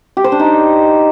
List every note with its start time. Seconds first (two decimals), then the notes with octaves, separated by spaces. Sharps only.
0.17 G4
0.24 C5
0.32 D4
0.40 D#4